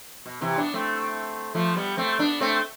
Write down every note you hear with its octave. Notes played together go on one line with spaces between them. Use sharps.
B2
C3 E3
B3 D4
A3 C4
F3 A3
G3 B3
A3 C4
B3 D4
A3 C4